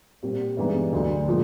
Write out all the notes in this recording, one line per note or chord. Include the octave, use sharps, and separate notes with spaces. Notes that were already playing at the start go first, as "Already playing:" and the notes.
A#2 G3 C4
G2 E3 G#3 B3 D#4
D2 D3 F#3
A#2 F3 G#3